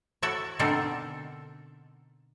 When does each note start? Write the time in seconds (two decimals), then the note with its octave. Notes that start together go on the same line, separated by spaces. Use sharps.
0.22 E4 F#4 A4 E5 F#5
0.59 B2 D3 C4 D#4 A4 A#4